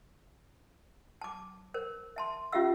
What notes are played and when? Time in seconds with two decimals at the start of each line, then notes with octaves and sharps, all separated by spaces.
1.22 A5 D6
1.74 A#4 C5
2.16 E5 A5 C6
2.53 C#4 F4 G4 E5 F5 E6